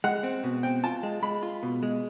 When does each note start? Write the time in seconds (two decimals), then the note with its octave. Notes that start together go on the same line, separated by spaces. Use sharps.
0.04 G#3 F#5
0.23 C4
0.44 B2
0.63 C4 G5
0.83 F4 A5
1.03 G#3
1.23 G#3 B5
1.43 F4
1.63 B2
1.83 G#3